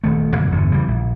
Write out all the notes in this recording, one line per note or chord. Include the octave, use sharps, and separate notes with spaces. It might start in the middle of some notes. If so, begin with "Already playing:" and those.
D#1 D#3 A3
F2 B2 D3 F#3
G1 E2 D3
C#3 E3 F3 G3
A#1